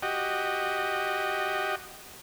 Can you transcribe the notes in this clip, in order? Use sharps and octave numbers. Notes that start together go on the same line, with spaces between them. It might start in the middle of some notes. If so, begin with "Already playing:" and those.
F#4 G4 D#5